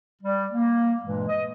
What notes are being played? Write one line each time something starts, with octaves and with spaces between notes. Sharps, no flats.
G3
A#3
G2 A#2 E3 G#3
D#5